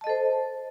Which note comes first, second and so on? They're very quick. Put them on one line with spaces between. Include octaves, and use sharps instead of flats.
A5 D#5 A4 C5